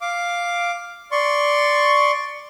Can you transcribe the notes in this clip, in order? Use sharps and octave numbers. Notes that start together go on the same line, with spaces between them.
F5 D6
D5 C6 C#6